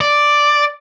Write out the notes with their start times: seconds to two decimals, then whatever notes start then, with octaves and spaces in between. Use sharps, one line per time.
0.01 D5